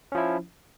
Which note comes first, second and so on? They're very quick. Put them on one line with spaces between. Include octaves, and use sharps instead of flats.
C#4 F3 E4